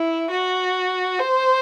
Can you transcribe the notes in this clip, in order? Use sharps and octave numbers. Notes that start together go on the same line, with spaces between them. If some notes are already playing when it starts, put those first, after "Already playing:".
Already playing: E4
F#4
C5